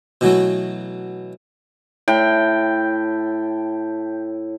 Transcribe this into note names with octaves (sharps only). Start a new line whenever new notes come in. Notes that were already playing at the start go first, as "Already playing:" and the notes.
B2 E3 F#3 A3
A2 G5